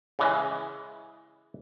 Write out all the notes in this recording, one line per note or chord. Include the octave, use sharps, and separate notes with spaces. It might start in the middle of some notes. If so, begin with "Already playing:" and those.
C#3 E3 G#3